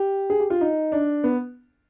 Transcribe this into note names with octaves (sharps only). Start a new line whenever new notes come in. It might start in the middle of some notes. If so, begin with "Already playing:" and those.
Already playing: G4
G#4
G4
F4
D#4
D4
B3